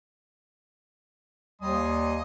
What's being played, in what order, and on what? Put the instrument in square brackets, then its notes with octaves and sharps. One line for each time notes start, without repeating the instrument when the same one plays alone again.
[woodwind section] D#2 G3 [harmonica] D#5 G#5 C6